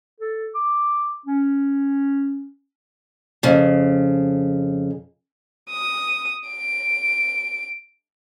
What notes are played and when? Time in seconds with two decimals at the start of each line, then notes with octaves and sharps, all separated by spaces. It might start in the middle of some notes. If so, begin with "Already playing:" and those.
0.20 A4
0.55 D6
1.26 C#4
3.43 F2 C#3
5.70 D#6
6.49 D7